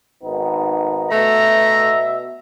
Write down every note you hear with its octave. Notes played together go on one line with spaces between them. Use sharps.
G#1 B3 D#4
B2 A3 E5 A#5